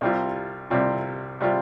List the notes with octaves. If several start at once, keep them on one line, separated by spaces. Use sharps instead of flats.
C2 C3 G3 C4 F4
C2 C3 G3 C4 F4
C3 G3 C4 F4